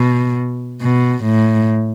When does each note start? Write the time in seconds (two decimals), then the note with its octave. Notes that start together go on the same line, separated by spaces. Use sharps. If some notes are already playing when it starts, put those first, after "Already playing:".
Already playing: B2
0.82 B2
1.25 A2